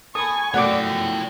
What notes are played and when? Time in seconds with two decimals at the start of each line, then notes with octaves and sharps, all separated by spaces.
0.15 A4 G#5 B5 C#6 D#6
0.54 F#2 B2 A3 C#5 D5 F#5 G5 D6
0.86 F3